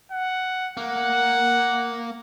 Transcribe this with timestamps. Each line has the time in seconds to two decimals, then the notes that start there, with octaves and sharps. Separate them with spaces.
0.12 F#5
0.77 A#3 F#5